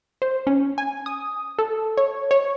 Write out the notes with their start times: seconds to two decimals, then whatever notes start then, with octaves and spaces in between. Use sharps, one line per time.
0.22 C5
0.47 C#4
0.78 G#5
1.06 D#6
1.59 A4
1.97 C#5
2.31 C#5